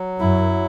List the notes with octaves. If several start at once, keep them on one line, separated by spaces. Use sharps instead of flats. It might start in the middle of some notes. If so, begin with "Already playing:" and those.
Already playing: F#3
F#2 E4